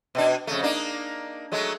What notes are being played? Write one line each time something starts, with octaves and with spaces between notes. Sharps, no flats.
B2 D4
F2 C#3 A3
A#3 D4 D#4
F#3 G#3 A3